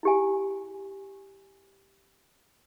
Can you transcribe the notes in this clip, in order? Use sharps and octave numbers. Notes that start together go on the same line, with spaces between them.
E4 G4 G#5